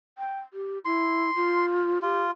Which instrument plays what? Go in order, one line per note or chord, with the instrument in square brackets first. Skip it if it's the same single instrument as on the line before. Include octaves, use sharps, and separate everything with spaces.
[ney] G5
G4
[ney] E4 [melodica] C6
[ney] F4
[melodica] F4 [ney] G4